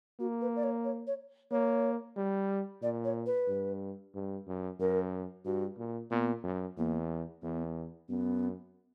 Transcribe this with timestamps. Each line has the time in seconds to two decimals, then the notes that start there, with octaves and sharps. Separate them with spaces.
0.20 A#3 F#4
0.42 B4
0.56 D5
0.63 C#5
0.85 C#5
1.07 C#5
1.51 A#3 C#5
2.16 G3
2.82 A#2 D5
3.05 C#5
3.26 B4
3.48 G2
4.14 G2
4.47 F#2
4.79 F#2 A#4
5.45 G2 F#4
5.78 A#2
6.11 A#2 B3
6.44 F#2
6.77 E2 A#3
7.42 E2 B3
8.09 F#2 B3